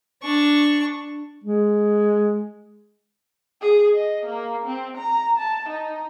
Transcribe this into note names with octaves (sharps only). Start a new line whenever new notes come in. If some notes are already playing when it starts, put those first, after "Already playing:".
D4 C#6
G#3
G#4
D#5
A#3
C4
A#5
A5
D#4